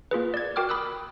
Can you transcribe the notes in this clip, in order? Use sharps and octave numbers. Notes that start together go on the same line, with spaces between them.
A#3 F4 G#4 B4
D5 G#6
F#4 A#4 G5 D6 F6
B5 D#6 E6 F#6